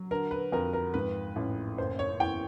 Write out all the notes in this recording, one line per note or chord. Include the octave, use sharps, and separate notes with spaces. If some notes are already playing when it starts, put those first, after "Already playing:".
Already playing: F#3
D3 A#4
B4
F2 A#4
A#4
G#2 B4
A1
F#1 C5
C#5
E2 G5